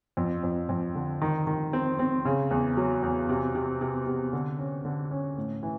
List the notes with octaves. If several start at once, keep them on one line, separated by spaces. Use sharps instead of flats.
F2
F2
F2
D3
D#3
D#3
C4
C4
C#3
E2
F#3
E2
C3
C3
C3
C3
D3
C#4
D3
C#4
A2
E3